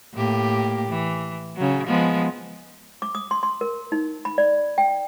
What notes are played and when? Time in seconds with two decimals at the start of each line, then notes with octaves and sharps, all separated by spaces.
0.13 A2 A#3 G4
0.89 E3
1.56 C#3 F#3
1.87 F3 G#3 B3
3.02 D6
3.15 D#6
3.31 C6
3.43 C6
3.61 A#4
3.92 D#4
4.25 B5
4.38 D5
4.78 G5